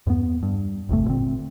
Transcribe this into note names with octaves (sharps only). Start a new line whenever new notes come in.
E2 G2 G3 B3
G2
G1 E2 C3 A3
A#2 D3 C4